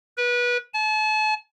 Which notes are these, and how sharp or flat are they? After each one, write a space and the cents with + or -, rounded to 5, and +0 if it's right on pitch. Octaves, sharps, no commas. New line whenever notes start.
B4 -25
A5 -40